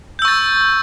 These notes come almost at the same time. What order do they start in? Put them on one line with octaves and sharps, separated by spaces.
G6 E6 C#6 A6